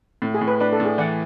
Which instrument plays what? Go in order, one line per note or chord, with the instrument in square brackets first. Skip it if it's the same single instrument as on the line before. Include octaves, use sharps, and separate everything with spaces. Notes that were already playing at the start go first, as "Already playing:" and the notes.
[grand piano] A2
[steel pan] G#4
[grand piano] A2
[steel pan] B4
[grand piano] D4 [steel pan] B4
[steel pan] A4
[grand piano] A2
[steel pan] G#4
[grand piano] E3 [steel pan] D5 F#5